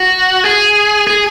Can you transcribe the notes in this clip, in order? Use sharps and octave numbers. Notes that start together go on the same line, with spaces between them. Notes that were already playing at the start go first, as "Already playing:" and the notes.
Already playing: F#4
G#4
G#4